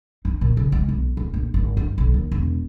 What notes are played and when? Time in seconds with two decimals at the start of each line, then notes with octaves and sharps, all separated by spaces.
0.25 D#4
0.41 A#2
0.57 C#3
0.72 G#3
0.89 B1
1.17 D1
1.34 A#1
1.54 G#1
1.77 G2
1.98 B1
2.14 D#2
2.32 E1